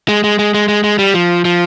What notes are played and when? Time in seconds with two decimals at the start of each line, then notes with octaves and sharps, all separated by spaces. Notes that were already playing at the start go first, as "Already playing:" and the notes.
0.08 G#3
0.24 G#3
0.39 G#3
0.54 G#3
0.68 G#3
0.84 G#3
0.99 G3
1.14 F3
1.45 F3